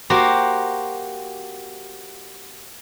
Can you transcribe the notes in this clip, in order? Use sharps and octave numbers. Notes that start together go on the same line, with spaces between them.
A#3 F#4 G4 C5